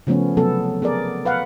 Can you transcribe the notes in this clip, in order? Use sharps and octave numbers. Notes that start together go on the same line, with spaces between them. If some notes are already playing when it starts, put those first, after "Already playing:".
C#3 F3 A3 B3 C#4
C3 F#3 B3 A4
B3 G#4 A#4 D5
B4 F5 F#5